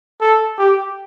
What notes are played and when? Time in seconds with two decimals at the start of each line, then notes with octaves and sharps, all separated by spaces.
0.21 A4
0.58 G4